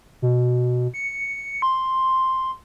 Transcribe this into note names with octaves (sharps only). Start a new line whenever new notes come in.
B2
C#7
C6